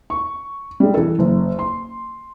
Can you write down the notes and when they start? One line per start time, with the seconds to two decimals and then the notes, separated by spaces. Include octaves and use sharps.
0.10 C#6
0.80 G3 G#3
0.94 E3 A4
1.19 F#1
1.59 C6